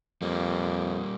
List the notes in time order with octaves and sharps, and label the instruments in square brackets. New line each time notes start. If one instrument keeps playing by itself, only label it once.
[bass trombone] F2 [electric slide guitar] G3 A#3